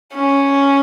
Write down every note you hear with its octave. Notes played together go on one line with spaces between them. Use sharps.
C#4